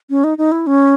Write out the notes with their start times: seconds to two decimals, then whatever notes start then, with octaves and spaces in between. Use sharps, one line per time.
0.10 C#4
0.24 D#4
0.38 D#4
0.52 E4
0.67 C#4